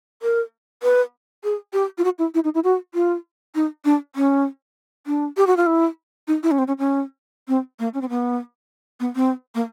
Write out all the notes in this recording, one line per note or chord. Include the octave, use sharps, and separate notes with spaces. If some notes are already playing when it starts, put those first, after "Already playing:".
A#4
B4
G#4
G4
F4
F#4
E4
E4
D#4
E4
F#4
F4
D#4
D4
C#4
D4
G4
F#4
F4
E4
D#4
E4
C#4
C4
C#4
C#4
C4
A#3
C#4
C4
B3
B3
C4
A#3